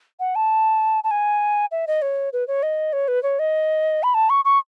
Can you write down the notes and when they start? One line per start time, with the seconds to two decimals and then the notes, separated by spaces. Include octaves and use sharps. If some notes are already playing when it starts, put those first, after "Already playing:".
0.20 F#5
0.36 A5
1.04 A5
1.11 G#5
1.72 E5
1.87 D#5
2.02 C#5
2.33 B4
2.48 C#5
2.63 D#5
2.93 C#5
3.08 B4
3.23 C#5
3.39 D#5
4.03 B5
4.14 A5
4.30 C#6
4.45 C#6